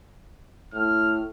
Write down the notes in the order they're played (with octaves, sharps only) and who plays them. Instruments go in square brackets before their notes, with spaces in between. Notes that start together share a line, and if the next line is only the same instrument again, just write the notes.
[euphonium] A2 [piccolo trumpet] F6